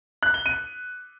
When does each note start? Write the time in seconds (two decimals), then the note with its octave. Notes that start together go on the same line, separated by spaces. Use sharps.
0.23 F#6
0.34 G7
0.46 D#7